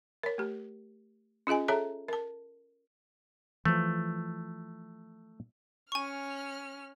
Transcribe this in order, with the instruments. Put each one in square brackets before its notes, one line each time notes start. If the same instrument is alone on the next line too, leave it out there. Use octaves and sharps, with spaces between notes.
[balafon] A#4 C#5
A3 G4
C#4 F4 G#4 D#5 G#5
G#4 A4 C#5 E5 A5 A#5
A#4 A5
[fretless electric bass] E3 F3 [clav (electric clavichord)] A3
[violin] C#4 F6 [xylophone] G#5 C#6